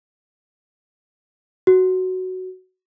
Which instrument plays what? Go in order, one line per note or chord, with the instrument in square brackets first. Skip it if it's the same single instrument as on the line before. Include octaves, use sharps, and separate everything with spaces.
[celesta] F#4